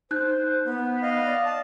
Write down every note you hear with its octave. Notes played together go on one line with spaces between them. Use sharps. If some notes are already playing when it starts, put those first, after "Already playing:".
D#4 C5 F#6 G6
B3
D#5 F5
D5
A5